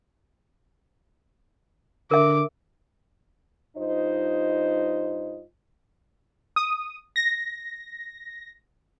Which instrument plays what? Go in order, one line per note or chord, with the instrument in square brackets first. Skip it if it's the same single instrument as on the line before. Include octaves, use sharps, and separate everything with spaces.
[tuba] D3 [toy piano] A#4 E5 [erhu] D6
[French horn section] G2 D#4 F4 C5 D#5
[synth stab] D#6
A#6